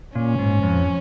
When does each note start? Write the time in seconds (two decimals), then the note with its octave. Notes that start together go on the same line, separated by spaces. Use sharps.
0.15 A#2 C#4
0.39 G#2
0.63 F2